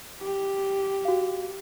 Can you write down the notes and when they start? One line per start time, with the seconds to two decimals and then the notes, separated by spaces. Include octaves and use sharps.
0.21 G4
1.05 F#4 F5